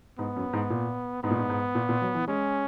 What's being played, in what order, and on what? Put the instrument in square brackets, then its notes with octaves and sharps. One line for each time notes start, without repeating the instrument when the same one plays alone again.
[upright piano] G#2 [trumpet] B3
[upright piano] F#2
G#2
A#2
[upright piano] G#2 [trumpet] B3
[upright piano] A#2
G#2
G#2
A#2
A#2
F#3
E3
[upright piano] G#3 [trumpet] C#4